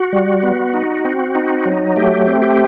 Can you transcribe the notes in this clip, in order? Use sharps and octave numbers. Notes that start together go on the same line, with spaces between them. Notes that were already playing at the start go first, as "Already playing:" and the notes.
Already playing: F#4
G3
B3
D#4
C4
D#4
F#3
A3 G4
C4
G4